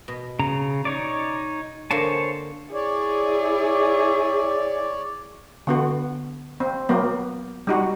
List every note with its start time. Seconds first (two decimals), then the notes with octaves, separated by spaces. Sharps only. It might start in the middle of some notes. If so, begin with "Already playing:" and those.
0.08 B2
0.39 C#3 A#5
0.85 D#4 C#5 D5
1.91 D3 A#3 C5 C#5 G#5 A5
2.74 E4 G#4 C#5 D5
5.67 D3 B3 F#4
6.60 C4
6.89 F#3 A#3 B3
7.67 G3 D#4 F#4